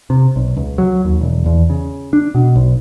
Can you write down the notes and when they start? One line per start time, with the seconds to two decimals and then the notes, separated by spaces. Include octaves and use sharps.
0.10 C3
0.36 B1
0.57 C#2
0.78 F#3
1.05 D#2
1.21 E1
1.46 E2
1.70 C#3
2.13 D4
2.35 B2
2.56 B1